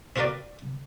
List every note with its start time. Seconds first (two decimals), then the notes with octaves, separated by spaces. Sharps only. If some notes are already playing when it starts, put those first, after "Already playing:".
0.16 C4 F4 F#4 A#4 B4 D5